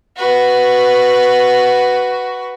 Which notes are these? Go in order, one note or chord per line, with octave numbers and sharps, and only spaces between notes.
F#4 B4